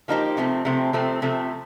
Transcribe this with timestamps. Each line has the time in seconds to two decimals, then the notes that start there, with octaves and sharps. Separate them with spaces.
0.08 F3 A#3 D#4 G4 C5
0.37 C3 F3 A3 C4
0.65 C3 F3 A3 C4
0.93 C3 F3 A3 C4
1.22 C3 F3 A3 C4